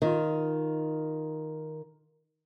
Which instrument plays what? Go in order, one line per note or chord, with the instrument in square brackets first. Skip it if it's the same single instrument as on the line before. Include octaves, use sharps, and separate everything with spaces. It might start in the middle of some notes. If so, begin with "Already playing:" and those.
[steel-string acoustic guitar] D#3 F4